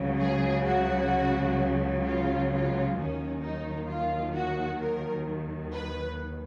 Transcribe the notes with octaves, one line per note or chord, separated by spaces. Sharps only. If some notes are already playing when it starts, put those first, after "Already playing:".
Already playing: C#2 C#3 F#3
G#4
F#4
F4
F4
D#2 D#3 F#3 C#4
D#4
F4
F#4
A#4
B4